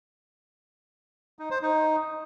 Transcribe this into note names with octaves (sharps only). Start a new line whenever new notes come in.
D#4
C5
D#4